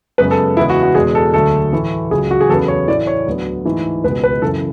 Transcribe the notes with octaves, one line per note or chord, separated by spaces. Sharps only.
F#2 C#3 G#3 B3 B4
A4
E2 C#3 G#3 B3 E4
F#4
F#4
E2 B2 G#3 G#4
A4
D2 D3 F#3 A3 A4
A2 E3 A3
C#2 C#3 F#3 G#4
F#4
G#4
E2 C#3 F#3 B3 A4
C#5
A2 E3 A3 D5
C#5
D2 D3 F#3 B3
G#2 E3 A3
C#2 B2 G#3 B3 B4
B4
F#2 C#3 E3 A4